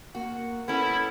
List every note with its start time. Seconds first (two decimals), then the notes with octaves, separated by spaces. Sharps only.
0.15 A#3 F#4
0.68 B3 C#4 E4 A4